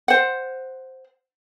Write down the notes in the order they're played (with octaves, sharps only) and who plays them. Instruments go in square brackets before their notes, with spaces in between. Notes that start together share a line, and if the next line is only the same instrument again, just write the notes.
[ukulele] C5 F#5